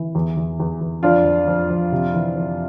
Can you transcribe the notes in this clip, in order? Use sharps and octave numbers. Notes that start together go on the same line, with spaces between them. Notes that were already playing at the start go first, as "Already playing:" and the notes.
Already playing: E3
E2
E2
E2
E2
F2 D4 F4
F2
F2
F2
C3
E3
F2